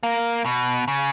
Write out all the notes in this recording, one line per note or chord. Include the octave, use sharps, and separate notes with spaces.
A#3
B2
C#3